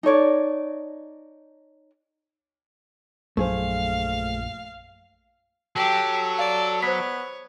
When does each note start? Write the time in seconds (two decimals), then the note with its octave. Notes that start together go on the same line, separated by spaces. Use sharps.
0.03 D#4 A4 C#5 D5
3.37 A#1 F#2 A3 G#4 C5 F5
5.76 F#3 G4 A4
6.39 D5 F5
6.82 B3 C5 C#5 B6